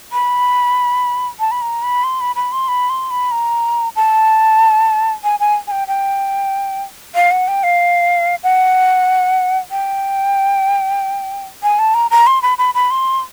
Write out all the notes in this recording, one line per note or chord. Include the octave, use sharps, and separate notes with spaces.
B5
A5
B5
A#5
B5
C6
B5
B5
C6
B5
C6
B5
A#5
A5
G#5
G#5
G#5
G5
G5
F5
F#5
G5
F5
F#5
G5
G#5
A5
A#5
A#5
C6
B5
B5
B5
C6